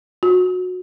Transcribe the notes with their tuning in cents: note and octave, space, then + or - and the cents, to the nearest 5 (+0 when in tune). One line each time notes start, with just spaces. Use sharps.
F#4 -20